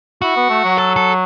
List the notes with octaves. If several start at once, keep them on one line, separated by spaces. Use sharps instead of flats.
E4 F#4
B3
A3
F#3
A4
A4